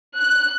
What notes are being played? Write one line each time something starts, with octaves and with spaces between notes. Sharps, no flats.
F#6